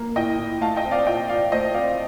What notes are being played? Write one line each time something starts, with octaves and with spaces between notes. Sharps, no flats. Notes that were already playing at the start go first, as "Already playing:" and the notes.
Already playing: A#3
A2 D#5 G5
A2
A3 F5 A5
D#5 G5
C4
D5 F5
A#2 D#5 G5
A#2 D5 F5
A3 C5 D#5
C4 D5 F5